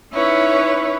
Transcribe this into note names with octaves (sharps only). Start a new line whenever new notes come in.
C#4 D#4 E4 B4 C#5